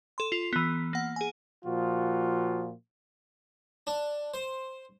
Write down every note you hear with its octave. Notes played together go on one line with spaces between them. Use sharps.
A4 C6
F4
E3 B3
A#3 F#5
G#4 G#5
A#2 F3 F4 F#4
D4
C5